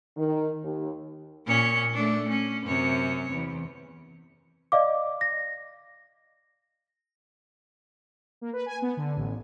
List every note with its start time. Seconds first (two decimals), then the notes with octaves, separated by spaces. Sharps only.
0.17 D#3
0.63 D#2
1.46 A#2 C#4 C#5
1.94 A3 D4
2.29 C#4
2.66 F#2 C3 C#5
3.31 E2
4.72 D5 D#5 F5 D6
5.21 A#6
8.41 A#3
8.53 B4
8.66 G#5
8.82 B3
8.97 D3
9.16 A1